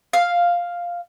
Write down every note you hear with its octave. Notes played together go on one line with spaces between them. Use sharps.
F5